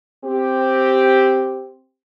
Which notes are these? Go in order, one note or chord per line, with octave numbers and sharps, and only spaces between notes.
C4 G4